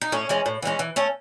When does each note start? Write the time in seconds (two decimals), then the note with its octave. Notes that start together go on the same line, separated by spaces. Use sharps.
0.01 D#4
0.12 A2 C#4
0.29 E3 G#3 C#4
0.46 A2
0.62 E3 G#3 C#4
0.79 E3
0.96 A3 C#4